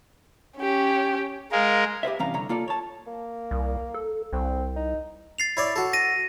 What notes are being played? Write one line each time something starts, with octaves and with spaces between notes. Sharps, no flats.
C#4 G4
G#3 A#4 F5
G4 B4 C5 E5
G2 C3 E3 C#4 F5 A#5
C2 D3 C#5 A#5
A#3 F4 A4 D5
C#5 A5
A#3
C2
A4
C2 C4
D#4
A6 C7 F7
E4 C#5 D5
F#4 A4
A#6 D#7